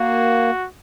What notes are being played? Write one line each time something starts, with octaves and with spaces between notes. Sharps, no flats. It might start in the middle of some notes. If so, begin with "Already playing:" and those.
Already playing: A#3 F#4